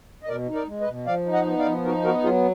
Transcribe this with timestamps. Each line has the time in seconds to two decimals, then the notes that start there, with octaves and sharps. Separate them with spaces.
0.23 D#5
0.28 B2 A#4 D5
0.49 D#4
0.55 A#4 D5
0.67 G#3
0.81 B4 D#5
0.88 B2
1.07 F3 D5 F5
1.26 D#4
1.33 D#5 F#5
1.46 B3
1.59 D5 F5
1.66 F3
1.84 D#4 F#4 A#4
2.04 B3 F#4 A#4
2.23 F#3 F4 G#4